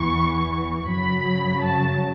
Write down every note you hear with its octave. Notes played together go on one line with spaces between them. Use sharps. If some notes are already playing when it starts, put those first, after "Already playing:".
Already playing: E2 E3 C#6
F#2 C#3 F#3 B5
A5